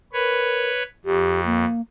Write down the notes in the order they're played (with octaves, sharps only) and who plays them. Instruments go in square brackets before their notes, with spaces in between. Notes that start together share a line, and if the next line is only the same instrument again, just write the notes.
[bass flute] A#4 [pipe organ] B4 C#5
[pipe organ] F2 [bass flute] G4
[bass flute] A#3